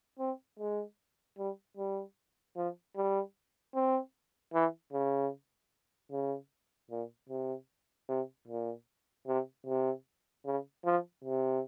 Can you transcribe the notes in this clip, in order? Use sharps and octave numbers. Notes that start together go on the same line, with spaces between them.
C4
G#3
G3
G3
F3
G3
C4
E3
C#3
C#3
A#2
C3
C3
A#2
C3
C3
C#3
F3
C3